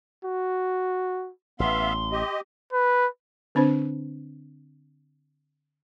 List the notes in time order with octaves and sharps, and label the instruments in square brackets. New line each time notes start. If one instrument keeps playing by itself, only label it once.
[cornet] F#4
[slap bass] A1 [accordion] B3 E5 F5 [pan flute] C6
[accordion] G4 D#5
[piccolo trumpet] B4
[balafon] D3 C4 D4 C5